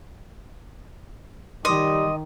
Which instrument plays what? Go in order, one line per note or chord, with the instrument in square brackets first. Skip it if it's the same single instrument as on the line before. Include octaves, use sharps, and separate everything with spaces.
[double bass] D#3 [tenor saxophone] G3 [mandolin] D#5 [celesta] C6 D6 D#6